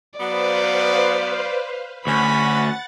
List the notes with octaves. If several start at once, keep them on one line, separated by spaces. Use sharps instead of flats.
F#3 B3 B4 C5 D5 F5
D2 C#4 F#4 F#5 B5 A6